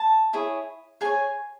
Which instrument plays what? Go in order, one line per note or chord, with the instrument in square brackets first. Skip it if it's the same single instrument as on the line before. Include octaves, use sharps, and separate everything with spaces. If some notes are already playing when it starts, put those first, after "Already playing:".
Already playing: [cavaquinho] A5
E4 G#4 C#5
G#4 C#5 G#5